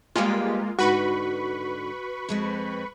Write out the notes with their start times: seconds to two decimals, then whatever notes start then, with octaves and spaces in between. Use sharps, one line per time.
0.16 G3 G#3 A#3 B3 F4 G4
0.79 G#2 D3 F#4 B4 B5 C#6
2.29 F2 G#3 C4